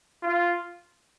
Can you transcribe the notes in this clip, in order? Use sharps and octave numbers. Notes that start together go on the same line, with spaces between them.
F4